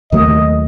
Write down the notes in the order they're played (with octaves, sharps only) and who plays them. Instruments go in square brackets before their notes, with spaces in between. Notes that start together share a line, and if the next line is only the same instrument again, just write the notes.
[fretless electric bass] D#2 D#3 F#3 A3 [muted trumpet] D#5